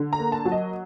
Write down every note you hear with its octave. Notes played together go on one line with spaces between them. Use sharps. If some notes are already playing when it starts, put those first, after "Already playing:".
Already playing: D3
A#5
A#3
A5
F#3
D#5